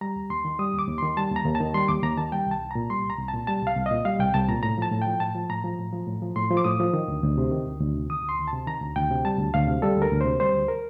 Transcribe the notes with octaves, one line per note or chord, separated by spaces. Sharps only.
G3 A#5
D#2
D#2 C6
D#3
G3 D#6
D#2
D6
D#2
D#3 C6
G3 A5
D#2 A#5
D#2
A5
D#3
G3 C6
D#2 D6
D#2 A#5
D#3 A5
G3 G5
C2 A5
C2
A#2 A#5
G3 C6
C2
A#5
C2
A5
A#2
G3 A5
C2 F5
C2
A#2 D#5
G3 F5
C2 G5
C2 A5
A#2 A#5
A2 A#5
F3 A5
A2
F3 G5
A2 A5
F3
A2 A#5
F3
A2
F3
A2
F3
A2 C6
F3
D6
A2 D#6
F3
D#3
D2
D2
C3
D#3
D2
D2
C3
D#3 D#6
D2
C6
D2
A5
C3
D#3 A#5
D2
D2 G5
C3
G3 A5
D2
D2 F5
C3
G3 A4
D2
A#4
D2
C3 C5
G3 C5
D2
A#4